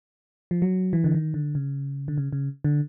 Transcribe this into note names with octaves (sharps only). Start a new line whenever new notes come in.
F3
F#3
E3
D3
D#3
D3
C#3
D3
C#3
C#3
D3